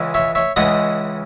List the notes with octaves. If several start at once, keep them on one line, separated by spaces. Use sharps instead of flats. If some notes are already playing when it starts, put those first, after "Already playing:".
Already playing: C#2 C#3 E3 G#3
C#5 E5
C#5 E5
C#2 C#3 E3 G#3 D#5 F#5